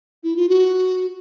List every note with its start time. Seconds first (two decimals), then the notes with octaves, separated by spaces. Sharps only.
0.24 E4
0.36 F4
0.49 F#4